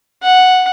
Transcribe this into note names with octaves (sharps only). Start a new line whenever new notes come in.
F#5